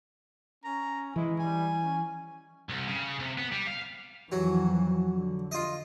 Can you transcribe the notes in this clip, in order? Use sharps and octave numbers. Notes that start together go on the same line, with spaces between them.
C#4 A#5
E3 G#3 E4
G3 G#5
C#4
C2
C#3
C3
B3
G3
F5
F2 E3 F#3
D3
F4 D#5